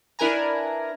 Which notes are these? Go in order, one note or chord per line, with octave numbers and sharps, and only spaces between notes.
D4 E4 A#4 B4 G#5 A#5